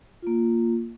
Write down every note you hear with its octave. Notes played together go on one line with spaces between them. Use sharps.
A#3 F4